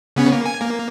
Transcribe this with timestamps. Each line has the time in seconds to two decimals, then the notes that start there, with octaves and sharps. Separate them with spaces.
0.16 C#3 B3 C#4
0.32 A#3
0.46 G#5
0.61 A#3